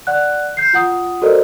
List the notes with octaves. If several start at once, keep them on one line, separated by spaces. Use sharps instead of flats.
D5 F#5 F#6
G6 C7
F4 F#5 D#6
F#4 A4 A#4 C5 D5 D#5